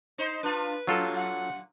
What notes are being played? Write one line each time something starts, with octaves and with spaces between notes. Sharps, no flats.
D#4 C5
D4 F4 B4
F#2 A#2 F#3 F4 A4
F#5